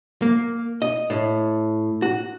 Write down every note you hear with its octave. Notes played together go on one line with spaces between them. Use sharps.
A#3
D#5
A2
F#4